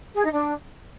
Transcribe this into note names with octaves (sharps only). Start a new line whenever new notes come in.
G#4
D#4
D4